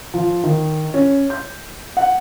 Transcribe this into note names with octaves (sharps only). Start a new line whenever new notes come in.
F3
D#3
C#4
G6
F#5